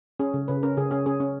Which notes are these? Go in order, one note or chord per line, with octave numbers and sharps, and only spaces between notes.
C#4 G#4
C#3
C#3 B4
C#4 A#4
C#3 G#4
C#4 G#4
C#4 G#4
C#4